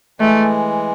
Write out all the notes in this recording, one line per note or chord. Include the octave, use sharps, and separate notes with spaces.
E3 G#3 A3